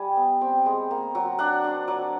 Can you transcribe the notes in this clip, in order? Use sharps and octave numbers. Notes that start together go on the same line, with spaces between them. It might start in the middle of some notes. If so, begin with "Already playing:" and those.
Already playing: G3 G#5
B3
C4 G5
G#3
A#3
F#3
D4 F#5
D4
F#3